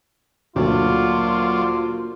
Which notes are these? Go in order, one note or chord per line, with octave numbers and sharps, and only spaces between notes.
D2 A#2 F#3 F4 C5 D5